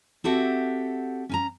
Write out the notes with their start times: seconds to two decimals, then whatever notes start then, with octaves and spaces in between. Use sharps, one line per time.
0.24 C4 F#4 G4 A4 E5 F#5
1.29 C#4 G#5 A#5